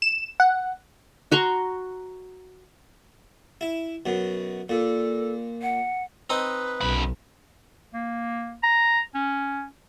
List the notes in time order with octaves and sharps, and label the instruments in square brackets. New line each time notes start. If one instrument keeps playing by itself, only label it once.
[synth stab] E7
F#5
[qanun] F#4 A#5 C6 C#6
[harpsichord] E4
F#2 B2
[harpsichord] A#2 [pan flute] A4
[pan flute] F#5
[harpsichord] C4 D#4 D#5 [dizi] B4
[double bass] B1 [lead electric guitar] F#2 B5
[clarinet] A#3
A#5
C#4